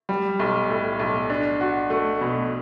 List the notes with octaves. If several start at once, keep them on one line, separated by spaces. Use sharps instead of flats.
G3
B1
A2
B1
D4
F#4
A3
B2